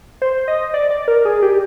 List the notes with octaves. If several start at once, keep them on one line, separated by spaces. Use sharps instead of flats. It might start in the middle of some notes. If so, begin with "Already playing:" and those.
C5
D#5
D5
D5
A#4
G#4
G4